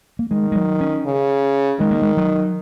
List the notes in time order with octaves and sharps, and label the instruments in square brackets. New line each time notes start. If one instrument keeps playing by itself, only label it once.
[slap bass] A#3
[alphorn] D#3 [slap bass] G#3
[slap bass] G#3
F#3
C#4
[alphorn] C#3
[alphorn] D#3 [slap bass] G#3
[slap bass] A#3
G#3
F#3